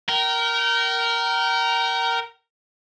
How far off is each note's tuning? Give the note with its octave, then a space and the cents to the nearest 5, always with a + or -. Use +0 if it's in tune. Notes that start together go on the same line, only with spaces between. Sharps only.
A#4 +0 G5 -35